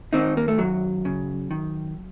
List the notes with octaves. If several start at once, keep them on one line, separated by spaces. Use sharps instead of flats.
D#3 C4 D#4
A#3
A3
F#2 F#3
C#3
D#3